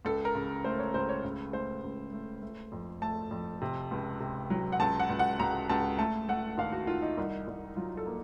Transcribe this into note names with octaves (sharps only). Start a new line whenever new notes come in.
C#2 A4
A#4
C#3
A3 C5
C#5
C#2 C5
C#5
C#3
A3 C5
C#2
A3
A3
F2
A3 A5
F2
C3
C#2
C3
F#3
F#5
C#2 A5
F#5
C#2
F#5
C#2 A#5
C#2 A5
A3 A5
A3 F#5
D#2 F5
F#4
D#3 F4
D#4
C2
C2
F#3 F4
A4
A#3